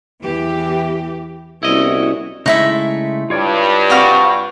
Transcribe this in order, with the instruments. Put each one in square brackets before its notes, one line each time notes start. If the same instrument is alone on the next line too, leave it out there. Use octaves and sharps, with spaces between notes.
[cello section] E2 E3 G4
[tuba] C2 [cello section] B3 C#4 F#4 [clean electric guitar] E4 D#5
[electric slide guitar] C#3 G#3 A3 [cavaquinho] D#4 E4 E5
[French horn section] G2 [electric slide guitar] F4 C#5 D5
[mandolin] C4 F#4 F5